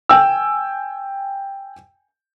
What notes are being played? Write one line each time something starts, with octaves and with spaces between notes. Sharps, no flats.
G5 G#5 E6